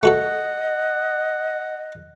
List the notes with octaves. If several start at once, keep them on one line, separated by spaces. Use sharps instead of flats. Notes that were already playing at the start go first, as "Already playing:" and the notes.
A3 F#4 A4 D#5 F#5